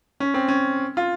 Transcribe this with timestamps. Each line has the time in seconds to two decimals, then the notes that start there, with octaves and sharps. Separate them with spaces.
0.20 C#4
0.34 C4
0.48 C#4
0.97 F4